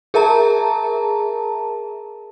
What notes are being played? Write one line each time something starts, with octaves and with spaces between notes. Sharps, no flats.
G#4 A#4 E5 A5 A#5